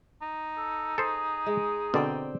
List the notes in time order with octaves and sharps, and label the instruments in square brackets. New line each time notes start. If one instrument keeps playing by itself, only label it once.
[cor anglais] D#4
[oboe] A4
[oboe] G#4 [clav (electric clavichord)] A4 C5
[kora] G#3
[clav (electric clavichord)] B2 D3 [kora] C4 D5 G5